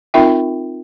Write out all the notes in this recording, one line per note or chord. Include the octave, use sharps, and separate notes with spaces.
C4 D#4 F4 A#4 E5 G5